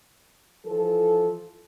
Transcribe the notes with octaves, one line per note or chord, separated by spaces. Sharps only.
E3 F3 A4